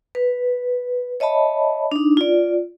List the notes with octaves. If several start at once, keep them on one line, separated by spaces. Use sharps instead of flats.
B4
C#5 D#5 E5 A5 B5
D4 D#4
F4 D5